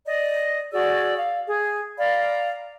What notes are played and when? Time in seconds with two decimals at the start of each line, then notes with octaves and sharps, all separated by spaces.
0.04 D5 D#5
0.72 F#4 G#4 D5 E6
1.17 F5
1.46 G#4
1.98 D5 F5 A#5 B5